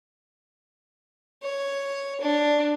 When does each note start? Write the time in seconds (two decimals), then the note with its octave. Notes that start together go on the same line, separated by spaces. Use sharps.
1.42 C#5
2.21 D4